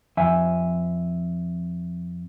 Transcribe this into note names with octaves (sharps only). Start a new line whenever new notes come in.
F2 E5 G#5